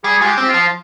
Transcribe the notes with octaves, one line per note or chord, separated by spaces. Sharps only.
G3 G#4
G#3 F4
G4
C4
F4
F3